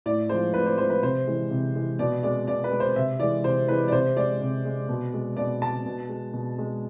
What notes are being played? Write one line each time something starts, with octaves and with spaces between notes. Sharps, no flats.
A2 D5
F3 G#3 C5
A2 B4
C5
F3 G#3 C5
B4
C3 C5
E3 G#3
C3
E3 G#3
B2 D5
G#3 D5
B2 D5
B4
G#3
C5
C3 E5
E3 G#3 D5
C3 C5
E3 G#3 B4
D5
C3 C5
G#3 D5
C3
G#3
B2
G#3
B2 D5
G#3 A5
B2
G#3
B2
G#3